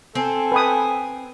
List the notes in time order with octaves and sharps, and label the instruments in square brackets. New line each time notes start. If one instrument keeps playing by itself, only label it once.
[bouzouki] C4 [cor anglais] A4 [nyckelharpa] G#5
[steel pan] B4 G5 D#6